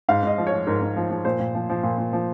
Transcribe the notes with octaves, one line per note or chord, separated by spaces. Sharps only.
G#2 F5
G#2 D#5
F3
C#5
F3
G#2 A#4
G#2
F3
F3
A#2 C5
A#2
F3
F3
A#2
A#2
F3